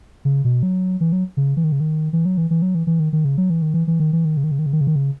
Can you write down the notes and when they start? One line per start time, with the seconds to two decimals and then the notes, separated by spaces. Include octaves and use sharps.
0.25 C#3
0.45 B2
0.63 F#3
1.01 E3
1.12 F#3
1.37 C#3
1.57 E3
1.64 D#3
1.72 C#3
1.80 D#3
2.13 E3
2.25 F#3
2.38 E3
2.50 E3
2.62 F#3
2.75 E3
2.87 E3
3.00 D#3
3.13 D#3
3.25 C#3
3.37 F#3
3.50 E3
3.62 D#3
3.74 E3
3.87 E3
4.00 D#3
4.13 E3
4.25 D#3
4.37 C#3
4.44 D#3
4.51 C#3
4.59 D#3
4.66 C#3
4.73 D#3
4.81 C#3
4.87 D#3
4.96 C#3